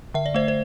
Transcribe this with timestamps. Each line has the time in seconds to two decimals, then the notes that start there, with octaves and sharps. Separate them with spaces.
0.14 D3 E5
0.26 D5
0.34 A3 C5 E5
0.48 C5